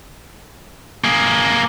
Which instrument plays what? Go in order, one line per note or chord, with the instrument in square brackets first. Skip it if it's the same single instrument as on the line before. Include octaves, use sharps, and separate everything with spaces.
[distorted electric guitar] A#3 G#4